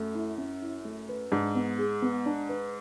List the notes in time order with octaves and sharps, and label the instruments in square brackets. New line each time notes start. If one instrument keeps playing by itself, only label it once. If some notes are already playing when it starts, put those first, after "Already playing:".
Already playing: [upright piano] F#2 [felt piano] A3
[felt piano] E4
C#4
E4
A3
B4
[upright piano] G#2 [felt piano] D4
[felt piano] B3
G#4
B3
D4
B4